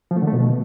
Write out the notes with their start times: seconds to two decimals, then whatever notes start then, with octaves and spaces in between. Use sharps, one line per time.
0.11 F3
0.16 A3
0.22 D3
0.27 A3
0.33 B2